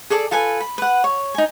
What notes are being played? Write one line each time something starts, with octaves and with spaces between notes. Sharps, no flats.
G#4 A4 D5 A5
F4 A4 B4 G#5
B5
B4 F#5
C#5
D#4 G#5